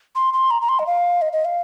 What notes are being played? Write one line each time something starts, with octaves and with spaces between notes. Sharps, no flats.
C6
C6
A#5
A#5
C6
D#5
F5
D#5
D#5
F5